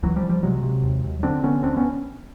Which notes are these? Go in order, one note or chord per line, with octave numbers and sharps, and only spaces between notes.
C#2 E3 F#3
F3 G3
C#2
F3 G3
C3 F#3 G#3
C3
D#2
D#2
D3 C4 D4
D3 B3 C#4
D2 C4 D4
B3 C#4